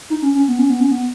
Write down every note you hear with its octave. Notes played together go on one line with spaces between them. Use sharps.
D#4
C#4
C#4
B3
C#4
B3
C#4
B3